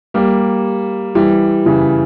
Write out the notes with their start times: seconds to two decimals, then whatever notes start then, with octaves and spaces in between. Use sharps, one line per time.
0.14 G3 A#3
1.15 E3 G3
1.66 C#3 E3